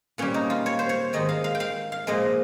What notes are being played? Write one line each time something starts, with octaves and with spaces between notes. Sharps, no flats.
A#2 G3 C#4
D#4
F4
C#5
C5
C#5
G#2 D#3 G#3 D#5
F5
F5
G5
F5
F5
A#2 F3 G#3 D#5